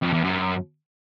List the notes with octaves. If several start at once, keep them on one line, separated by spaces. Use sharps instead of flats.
F2
E2
F#2